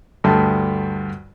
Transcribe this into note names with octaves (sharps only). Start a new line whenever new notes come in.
D2 G2 A3 A5